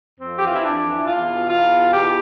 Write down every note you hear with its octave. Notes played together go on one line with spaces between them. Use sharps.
F2 C4
E3 G4
F4
E4
F2 D4
E3
E4
E2 F4
B2
E2 F4
B2
E2 G4